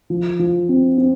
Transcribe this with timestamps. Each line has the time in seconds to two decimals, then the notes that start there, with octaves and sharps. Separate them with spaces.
0.10 F3
0.39 F3
0.69 C4
0.98 C4